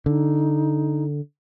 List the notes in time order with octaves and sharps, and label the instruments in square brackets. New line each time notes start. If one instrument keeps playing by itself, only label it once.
[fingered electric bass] D3 [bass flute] D#4